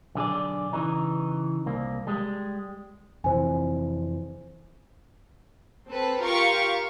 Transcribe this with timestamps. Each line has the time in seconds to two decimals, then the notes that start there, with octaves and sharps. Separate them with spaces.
0.15 B1 D3 G#4 D5
0.73 C#3 E3 D#4
1.66 C2 A#3
2.07 G3 G#3
3.24 F2 C3 E3 C5 G#5
5.89 C4 A4 B4
6.22 F4 G4 A#4 F5 G5 C#6